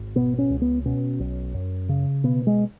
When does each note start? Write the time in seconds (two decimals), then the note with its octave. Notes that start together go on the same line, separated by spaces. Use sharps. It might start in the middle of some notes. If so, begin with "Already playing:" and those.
Already playing: G#1
0.16 B2 B3
0.38 C#4
0.50 C#2
0.62 B3
0.85 B2 C#4
1.20 B1
1.54 F#2
1.89 C#3
2.24 B2 B3
2.47 G#3